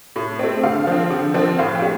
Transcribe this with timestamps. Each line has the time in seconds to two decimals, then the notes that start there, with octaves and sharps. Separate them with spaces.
0.16 A2
0.39 A3 C4
0.63 D3 F5
0.87 F3 C4
1.10 D3
1.34 F3 C4
1.59 A2 F5
1.75 G5
1.82 A3